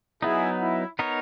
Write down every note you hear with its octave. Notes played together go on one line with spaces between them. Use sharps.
F#3 B3 D#4 E4 G#4
E4
B3 D#4 A#4 C#5